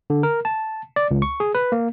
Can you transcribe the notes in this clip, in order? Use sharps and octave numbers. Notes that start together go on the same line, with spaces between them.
D3
A#4
A5
D5
C#2
C#6
G#4
B4
A#3